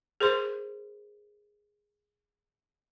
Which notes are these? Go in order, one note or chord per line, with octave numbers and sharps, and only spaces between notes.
G#4 A#4 C5 C6